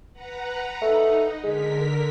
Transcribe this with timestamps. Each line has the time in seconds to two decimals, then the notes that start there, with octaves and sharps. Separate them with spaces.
0.13 B4 F#5 A#5
0.81 A3 D#4
1.43 D3 G#3 A#4 B6